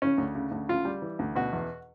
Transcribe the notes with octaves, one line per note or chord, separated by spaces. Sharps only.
C#3 C#4
D2
C#3
D2
C#3 F4
G3
E3
D2
B2 F#4
E2